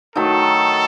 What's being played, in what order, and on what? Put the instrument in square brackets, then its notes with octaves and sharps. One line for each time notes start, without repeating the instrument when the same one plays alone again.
[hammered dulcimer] D#3 F#3 A3 D#4 [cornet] A4